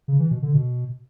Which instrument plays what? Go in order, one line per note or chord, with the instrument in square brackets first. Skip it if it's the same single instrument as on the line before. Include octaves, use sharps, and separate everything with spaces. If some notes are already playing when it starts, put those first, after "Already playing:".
[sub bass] C#3
E3
B2
D3
B2